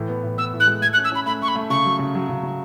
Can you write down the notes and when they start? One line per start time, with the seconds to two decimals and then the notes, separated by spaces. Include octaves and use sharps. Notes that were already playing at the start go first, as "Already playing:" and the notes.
Already playing: A2 E3
0.09 B3
0.23 A2
0.38 B3 E6
0.53 A2
0.60 F#6
0.67 G#3
0.82 A3 G#6
0.93 F#6
0.97 C#4
1.04 E6
1.12 C#4 B5
1.26 A3 B5
1.41 A3 C#6
1.48 B5
1.56 A3
1.70 C#3 C#6
1.85 F#3
1.99 C#3
2.15 F#3
2.29 C#3
2.44 C#3